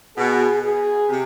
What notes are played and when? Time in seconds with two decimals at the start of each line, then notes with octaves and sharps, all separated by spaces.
0.17 B2 G#4
0.63 G#4
1.09 C3